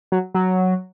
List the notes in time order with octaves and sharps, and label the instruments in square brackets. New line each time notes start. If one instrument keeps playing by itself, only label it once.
[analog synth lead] F#3
F#3